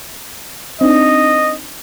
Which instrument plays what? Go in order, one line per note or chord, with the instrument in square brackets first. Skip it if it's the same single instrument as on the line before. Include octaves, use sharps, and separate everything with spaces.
[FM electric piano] C4 D4 D#4 [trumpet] D#5